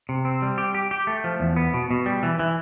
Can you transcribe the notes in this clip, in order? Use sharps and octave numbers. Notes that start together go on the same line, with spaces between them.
C3
C4
G3
G4
G4
G4
A3
F3
E2
B3
B2
B2
G3
E3
E3